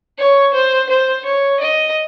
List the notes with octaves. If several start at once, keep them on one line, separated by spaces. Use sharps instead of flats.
C#5
C5
C5
C#5
D#5